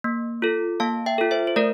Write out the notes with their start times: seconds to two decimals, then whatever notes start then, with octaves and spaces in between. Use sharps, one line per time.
0.04 A#3
0.42 F4 A4
0.80 A#3 F5 A5
1.06 E5 G5
1.18 F4 A4
1.31 C5 E5
1.47 C5
1.56 A3 A#4 D5